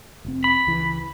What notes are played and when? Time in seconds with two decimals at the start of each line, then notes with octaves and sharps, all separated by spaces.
0.25 F1 C4
0.44 B5
0.67 C#2 E3